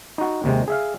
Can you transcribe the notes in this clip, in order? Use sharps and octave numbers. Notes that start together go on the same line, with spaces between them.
D#4 F#4
D#2 C3 G#3
G#4 E5 F5